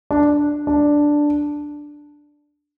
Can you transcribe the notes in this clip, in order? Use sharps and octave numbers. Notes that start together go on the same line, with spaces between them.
D4
D4